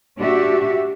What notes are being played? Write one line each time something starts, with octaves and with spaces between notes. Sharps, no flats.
D4 F#4 G4 E5